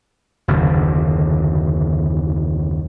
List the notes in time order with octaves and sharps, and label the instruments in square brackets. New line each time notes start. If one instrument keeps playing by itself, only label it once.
[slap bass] F#1 D#2 B2 D3